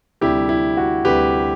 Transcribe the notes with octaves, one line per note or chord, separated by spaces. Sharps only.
D2 C3 G3 E4 G4
E4
F#4
D2 C3 G3 G4 B4